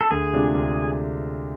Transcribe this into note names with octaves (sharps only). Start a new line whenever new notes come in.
A4
D2 G#4
C3 G#3 D4 F4
D2